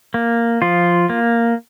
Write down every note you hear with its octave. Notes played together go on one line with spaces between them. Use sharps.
A#3
F3 F4
A#3